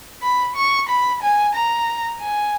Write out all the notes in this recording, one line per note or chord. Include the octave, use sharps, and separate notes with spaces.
B5
C#6
B5
G#5
A#5
G#5